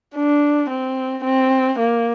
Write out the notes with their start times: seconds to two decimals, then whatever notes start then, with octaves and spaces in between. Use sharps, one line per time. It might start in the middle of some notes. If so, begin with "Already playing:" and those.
0.15 D4
0.69 C4
1.24 C4
1.79 A#3